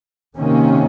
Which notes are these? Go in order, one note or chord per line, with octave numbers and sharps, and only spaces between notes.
C3 D#3 A#3 C#4